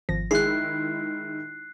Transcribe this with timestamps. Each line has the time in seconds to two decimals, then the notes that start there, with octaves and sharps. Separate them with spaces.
0.09 G#1 F3 A#6
0.31 D#3 G#3 E4 G#4 F#6 C7